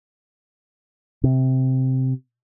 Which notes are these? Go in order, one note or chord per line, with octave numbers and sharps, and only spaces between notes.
C3